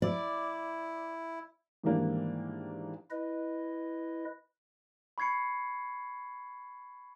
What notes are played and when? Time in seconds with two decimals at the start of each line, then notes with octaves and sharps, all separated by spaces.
0.02 E4 D5
1.84 G#2 D#3 E3 G3 A#3 D4
3.11 E4 B4 D#5
5.18 B5 C#6 G#6 C7 C#7